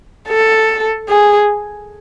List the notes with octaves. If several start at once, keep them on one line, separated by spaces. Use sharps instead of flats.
A4
G#4